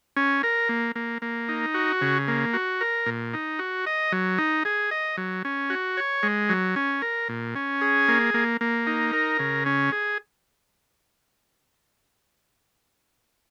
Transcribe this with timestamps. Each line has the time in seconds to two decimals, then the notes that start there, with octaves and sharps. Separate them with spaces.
0.17 C#4
0.43 A#4
0.69 A#3
0.96 A#3
1.22 A#3
1.48 D#4
1.74 F#4
2.01 C#3
2.28 A#3
2.54 F#4
2.81 A#4
3.06 A#2
3.34 D#4
3.59 F#4
3.86 D#5
4.12 F#3
4.38 D#4
4.65 G#4
4.91 D#5
5.17 F#3
5.45 C#4
5.70 F#4
5.97 C#5
6.23 G#3
6.49 F#3
6.76 C#4
7.02 A#4
7.29 A#2
7.55 C#4
7.81 G#4
8.08 A#3
8.34 A#3
8.61 A#3
8.87 D#4
9.13 A#4
9.39 C#3
9.66 C#4
9.92 G#4